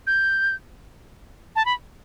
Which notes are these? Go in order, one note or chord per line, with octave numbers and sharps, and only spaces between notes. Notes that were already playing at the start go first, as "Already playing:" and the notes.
G6
A5
B5